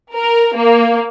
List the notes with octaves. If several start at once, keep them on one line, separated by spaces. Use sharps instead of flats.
A#4
A#3